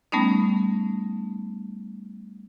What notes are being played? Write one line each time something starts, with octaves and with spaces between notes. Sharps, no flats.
G3 A3 B3 C#4 D#4